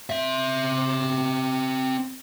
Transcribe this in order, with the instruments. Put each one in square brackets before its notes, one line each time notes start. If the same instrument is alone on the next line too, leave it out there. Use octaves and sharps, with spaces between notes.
[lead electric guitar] C4 E5